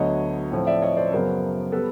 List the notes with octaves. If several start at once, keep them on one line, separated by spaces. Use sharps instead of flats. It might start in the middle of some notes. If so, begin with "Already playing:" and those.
Already playing: D2 D3 F#3 B3 C#5 D#5
A2 F3 A3 C4
D5 E5
C#5 D#5
C5 D5
F#2 C#3 F#3 B3 A#4 C5
G3 B3 A4 B4